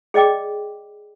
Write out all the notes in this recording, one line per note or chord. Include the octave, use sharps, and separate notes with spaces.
G#4 D5 D#5 G5 D6